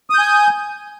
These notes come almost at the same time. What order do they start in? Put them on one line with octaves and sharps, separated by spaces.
D#6 G6 G#5